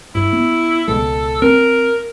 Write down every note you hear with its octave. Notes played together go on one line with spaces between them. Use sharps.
G2 E4
B3
C#2 B2 G#3 A4
C4 A#4